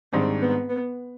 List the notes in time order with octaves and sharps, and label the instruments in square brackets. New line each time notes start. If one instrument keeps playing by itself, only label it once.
[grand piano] G#2 D#3 G3 D4 G#4 [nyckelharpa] C4
[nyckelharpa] B3
B3